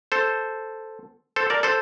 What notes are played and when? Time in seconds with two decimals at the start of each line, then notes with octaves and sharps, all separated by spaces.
0.12 A4 C5
1.36 A4 C5
1.50 A#4 D5
1.63 A4 C5